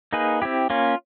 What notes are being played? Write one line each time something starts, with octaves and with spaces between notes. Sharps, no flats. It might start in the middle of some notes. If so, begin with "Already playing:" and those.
A#3 D#4 G#4 B4
C4 E4 G4
A#3 C#4 F4